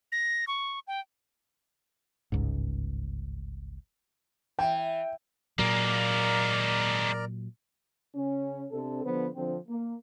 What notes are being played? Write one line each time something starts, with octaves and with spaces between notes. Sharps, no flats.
A#6
C#6
G5
G1 C#2 G#2
E3 G5
A#2 F#3 G#3 A#3 A#4 D5 A#5
C#3 C#4
C3 C4 D4 A4
D3 F3 B3 B4 C5
D3 F3 C4
A#3